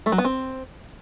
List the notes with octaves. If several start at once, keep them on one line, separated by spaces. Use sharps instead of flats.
A3
F#3
B3
C4